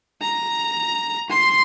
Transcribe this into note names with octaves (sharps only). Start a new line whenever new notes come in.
A#5
C6